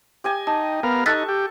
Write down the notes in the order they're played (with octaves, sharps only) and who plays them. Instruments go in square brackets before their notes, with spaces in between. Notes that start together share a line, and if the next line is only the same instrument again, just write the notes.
[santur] G4 D#5 G#5
[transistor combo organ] D#4 [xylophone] A5
[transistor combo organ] B3 A#4 F5
[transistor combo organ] D#4 [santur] A4 A5 C#6 [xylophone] F#6 A6 B6
[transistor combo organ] G4